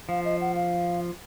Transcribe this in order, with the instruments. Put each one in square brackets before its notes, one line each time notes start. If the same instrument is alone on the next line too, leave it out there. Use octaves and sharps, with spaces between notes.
[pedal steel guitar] F3 [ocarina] F5
[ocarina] D#5
F#5
F5